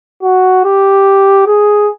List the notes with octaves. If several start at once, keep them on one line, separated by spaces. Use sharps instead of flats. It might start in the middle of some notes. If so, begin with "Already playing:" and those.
F#4
G4
G#4